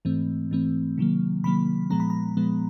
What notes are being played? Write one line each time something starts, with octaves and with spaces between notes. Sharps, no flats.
G#2 E3 A3 C4
G#2 E3 A3 C4
C3 D#3 F#3 A#3
C3 D#3 F#3 A#3 B5
A#2 F3 G#3 B3 A#5
B5
A#5
A#2 F3 G#3 B3